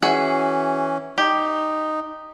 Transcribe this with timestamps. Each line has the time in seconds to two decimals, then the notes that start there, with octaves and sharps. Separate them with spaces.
0.02 E3 C#4 F#4 G#4 E5
1.18 D#4 G4